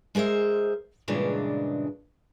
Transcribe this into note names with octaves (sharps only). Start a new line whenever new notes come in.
G#3 G#4 A#4 C5 E5
G2 A#2 C#3 E3 G#3 D4